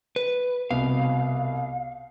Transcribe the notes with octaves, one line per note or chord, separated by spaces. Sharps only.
B4
C2 B2 F5